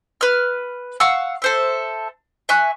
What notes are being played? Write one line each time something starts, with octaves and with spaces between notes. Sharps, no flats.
B4 F6
F5 F#5 C#6 E6
A4 C5 E5
E5 G#5 C#6 F#6